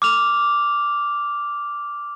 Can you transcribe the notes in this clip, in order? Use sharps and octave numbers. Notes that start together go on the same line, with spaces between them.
D6 F6 F7